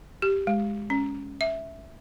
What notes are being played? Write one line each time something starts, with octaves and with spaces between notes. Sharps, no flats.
G4
G#3
C#4
E5